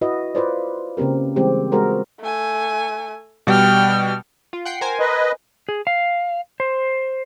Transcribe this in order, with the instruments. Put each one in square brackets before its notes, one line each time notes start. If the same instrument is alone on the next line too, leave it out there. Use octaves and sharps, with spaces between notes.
[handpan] E4 F#4 B4 D#5 E5
F4 B4 C5 D5
C#3 A#3 C4 G4 A#4
E3 G3 G#3 C4 G4
G#3 B3 F#4 G#4 A#4 C5
[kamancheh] A3 G#5
[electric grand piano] B2 G3 [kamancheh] G5 F6
[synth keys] F4
F#5 G5 C7
A#4 C5 G#5
[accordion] B4 D#5
[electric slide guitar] G#4
F5
C5